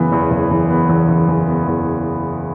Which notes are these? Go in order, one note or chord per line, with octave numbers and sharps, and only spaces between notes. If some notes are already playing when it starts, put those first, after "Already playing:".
Already playing: F#1 E3 B3
E2
F#1
E3
B3
E2
F#1
E3
B3
E2